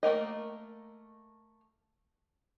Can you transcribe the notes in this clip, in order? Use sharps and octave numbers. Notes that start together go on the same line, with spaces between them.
A3 A#3 A#4 D#5